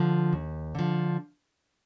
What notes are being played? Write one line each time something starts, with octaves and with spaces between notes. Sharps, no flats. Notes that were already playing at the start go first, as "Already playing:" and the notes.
Already playing: D3 F3
D#2
D3 F3